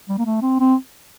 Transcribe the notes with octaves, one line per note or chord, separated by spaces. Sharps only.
G3
A#3
A3
C4
C4